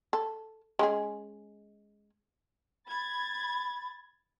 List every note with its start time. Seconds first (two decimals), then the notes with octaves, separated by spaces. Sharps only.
0.13 A4
0.79 G#3 C#4 G#4
2.88 B5 G#6 A6